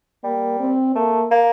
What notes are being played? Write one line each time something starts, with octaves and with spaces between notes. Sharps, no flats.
G3 A#3
C4
A3 A#3
A#3